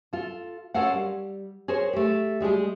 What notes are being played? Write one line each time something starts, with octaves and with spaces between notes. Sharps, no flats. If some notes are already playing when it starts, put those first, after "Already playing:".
F4 A4
C#4 F4 A4 A#4 F5 F#5
G3
G#4 A#4 C5 C#5
A3 G4
G3 G#3 G4 G#4